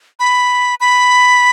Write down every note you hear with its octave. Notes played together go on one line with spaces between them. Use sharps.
B5
B5